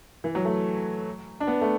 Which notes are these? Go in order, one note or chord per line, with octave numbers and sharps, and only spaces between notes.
E3
F#3
A3
D4
B3
A3